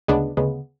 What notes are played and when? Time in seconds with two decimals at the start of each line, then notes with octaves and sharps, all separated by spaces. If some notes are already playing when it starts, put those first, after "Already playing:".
0.08 D2 C#3 G#3 B3 D4
0.37 D2 C#3 G#3 B3